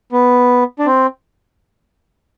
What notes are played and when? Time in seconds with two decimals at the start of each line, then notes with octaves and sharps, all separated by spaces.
0.12 B3
0.79 D4
0.86 C4